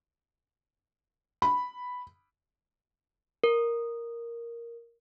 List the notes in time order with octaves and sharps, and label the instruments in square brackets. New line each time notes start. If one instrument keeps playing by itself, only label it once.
[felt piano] B5
[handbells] A#4